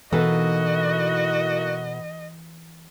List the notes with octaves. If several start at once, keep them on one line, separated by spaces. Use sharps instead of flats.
B2 E3 A#3 D#4 E4 F#4 A4 D#5